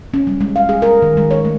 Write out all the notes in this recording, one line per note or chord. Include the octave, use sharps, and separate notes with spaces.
C#4
G3
G#3
F5
G#4
A#4
D#3
G#3
C#5
A3